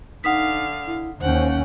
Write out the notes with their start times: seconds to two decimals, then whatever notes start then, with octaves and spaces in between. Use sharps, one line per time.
0.24 D3 D#4 F5 F#5 D#6 B6
0.87 E4
1.21 D#2 C#4 C5 F#5 G5